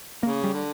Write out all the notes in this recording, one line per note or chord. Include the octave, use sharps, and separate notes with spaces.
C#3 A#3
G3
D3